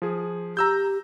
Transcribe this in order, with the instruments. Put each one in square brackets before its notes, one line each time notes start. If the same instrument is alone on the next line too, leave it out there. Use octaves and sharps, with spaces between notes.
[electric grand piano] F3 G#4
[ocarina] G4 [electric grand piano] A#5 E6 G6